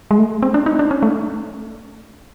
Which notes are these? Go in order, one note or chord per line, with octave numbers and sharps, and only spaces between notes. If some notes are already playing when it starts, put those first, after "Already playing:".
G#3
A3
C4
D4
D#4
D4
C#4
A3